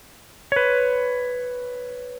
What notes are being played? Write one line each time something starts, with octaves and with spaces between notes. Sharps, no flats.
B4 C#5